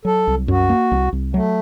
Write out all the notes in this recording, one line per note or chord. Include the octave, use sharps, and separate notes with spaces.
F#3 A4
C2
F#2 F#4
A#3
C2
C2
F#3 A3